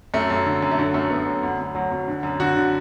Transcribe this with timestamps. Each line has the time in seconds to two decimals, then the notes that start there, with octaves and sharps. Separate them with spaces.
0.14 F#2 A3
0.30 F#2
0.46 D3
0.62 F#2
0.71 A3
0.78 D3 F#3
0.94 F#2 A3
1.11 F#2 B3
1.27 F#2
1.43 D2
1.59 D2
1.75 D2 F#3
1.91 D2
2.08 D3
2.23 F#2
2.40 D3 F#4
2.56 D3